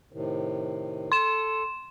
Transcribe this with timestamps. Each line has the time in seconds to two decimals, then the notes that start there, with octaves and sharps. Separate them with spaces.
0.13 A2 C3 D#3
1.12 A4 C6 E7